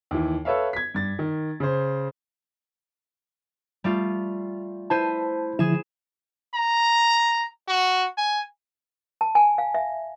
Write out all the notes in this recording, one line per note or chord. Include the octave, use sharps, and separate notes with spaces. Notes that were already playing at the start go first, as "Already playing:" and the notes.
D#2 E3
A4 B4 C#5 E5 F5
G#6 B6
G2 A6
D#3
C#3 C5
G3 A3 F4
E4 C5 A5 D#7
D3 F3 E4 G#4 E7
A#5
F#4
G#5
A5
G#5
F5
E5